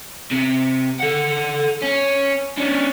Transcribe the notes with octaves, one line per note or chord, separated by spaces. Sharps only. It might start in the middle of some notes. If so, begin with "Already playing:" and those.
C3
A4 F#5
C#4
C#4 D4